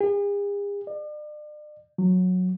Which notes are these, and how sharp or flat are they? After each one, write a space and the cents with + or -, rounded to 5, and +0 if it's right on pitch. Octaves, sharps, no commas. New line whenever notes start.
G#4 -45
D5 +40
F#3 -15